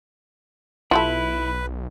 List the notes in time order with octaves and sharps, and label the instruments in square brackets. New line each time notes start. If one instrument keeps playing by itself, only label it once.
[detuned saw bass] B1 [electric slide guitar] E4 [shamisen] F4 G4 A4 [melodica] B4